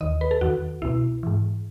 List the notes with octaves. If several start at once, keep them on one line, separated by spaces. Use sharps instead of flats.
D#2 D#3 D#5
B4
A4
E2 D#3 F#4
C#2 B2 E4
G#2 E3